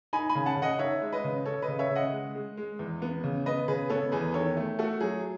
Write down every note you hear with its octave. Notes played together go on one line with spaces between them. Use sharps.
D#4 G#5 B5
G#5 B5
C#3
F#5 A5
C#3
D#5 F#5
D#4 C#5 E5
G#3
B4 D#5
C#3
C#4 A4 C#5
B4 D#5
C#3
C#5 E5
C#3
D#5 F#5
G#3
G#3
G#3
E2
B3
C#3
B3 B4 D#5
C#3 G#4 B4
B3 A4 C#5
E2 G#4 B4
D#3 A4 C#5
A3
A3 F#4 A4
F#3 G#4